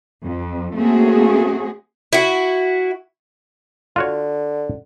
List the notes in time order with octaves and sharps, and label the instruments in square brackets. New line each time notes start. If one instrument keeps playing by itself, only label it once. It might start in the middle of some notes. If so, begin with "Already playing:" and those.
[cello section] F2
A3 A#3 C4 C#4 F#4 G#4
[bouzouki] E4 F#4
[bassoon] D3 [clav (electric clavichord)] F4 F#4 C#5